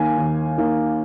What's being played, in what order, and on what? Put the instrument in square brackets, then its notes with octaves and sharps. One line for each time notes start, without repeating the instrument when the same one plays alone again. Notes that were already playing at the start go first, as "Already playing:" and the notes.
Already playing: [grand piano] D#2 D#3 A#3 G#5
D#2
D#3 A#3